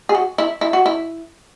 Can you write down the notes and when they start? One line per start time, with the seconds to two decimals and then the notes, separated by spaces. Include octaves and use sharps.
0.09 G#4
0.15 F#4
0.38 E4
0.61 E4
0.73 F#4
0.86 E4